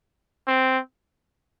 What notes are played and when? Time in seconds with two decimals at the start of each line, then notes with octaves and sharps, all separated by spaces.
0.48 C4